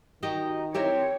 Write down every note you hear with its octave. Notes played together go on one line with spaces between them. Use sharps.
D#3 D#4 F#4 G4
C4 E4 G4 A#4 C#5